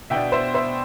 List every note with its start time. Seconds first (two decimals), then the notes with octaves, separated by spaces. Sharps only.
0.10 B2 B3 D4 E5 G5
0.32 C5 E5
0.54 C5 E5